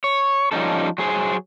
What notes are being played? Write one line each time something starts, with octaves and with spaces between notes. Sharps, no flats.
C#5
F3 G3 C#4 D#4 A4
F#3 G#4 C5